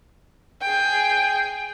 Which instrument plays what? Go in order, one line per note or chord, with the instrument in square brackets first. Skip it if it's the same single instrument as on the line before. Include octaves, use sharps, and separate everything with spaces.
[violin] G#4 G5